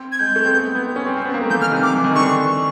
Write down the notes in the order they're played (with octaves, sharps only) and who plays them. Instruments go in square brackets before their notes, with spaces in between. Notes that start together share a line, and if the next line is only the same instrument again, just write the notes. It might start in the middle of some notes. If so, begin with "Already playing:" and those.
Already playing: [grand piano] C4
[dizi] G#6
[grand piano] G#3 [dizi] G6
[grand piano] A3
C4
B3
B3
C4
C#4
C4
C4
B3
A#3
A3
[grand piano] E3 [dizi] G6
[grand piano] D#3 [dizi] F6
[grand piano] C3
[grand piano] C3 [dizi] D6
[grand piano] E3
D#3
[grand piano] D3 [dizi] C#6